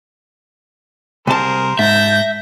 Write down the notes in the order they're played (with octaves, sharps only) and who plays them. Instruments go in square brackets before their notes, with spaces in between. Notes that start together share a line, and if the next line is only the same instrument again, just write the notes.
[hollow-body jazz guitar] C2 A5 [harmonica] G#4 A#4 C5
[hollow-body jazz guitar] G#2 [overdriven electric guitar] E5 [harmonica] A5 [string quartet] G6 A#6